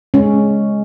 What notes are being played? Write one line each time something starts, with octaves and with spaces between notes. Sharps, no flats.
G#3 C#4